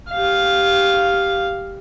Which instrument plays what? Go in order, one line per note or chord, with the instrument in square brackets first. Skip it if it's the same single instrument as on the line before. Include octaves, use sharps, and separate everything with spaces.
[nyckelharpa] G4 F5